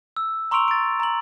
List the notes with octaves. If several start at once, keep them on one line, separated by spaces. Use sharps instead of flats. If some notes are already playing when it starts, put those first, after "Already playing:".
E6
A#5 C6 C#6 E6 D7 F7
A6 D7
A#5 F#7